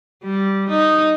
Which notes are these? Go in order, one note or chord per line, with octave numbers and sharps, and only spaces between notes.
G3
D#4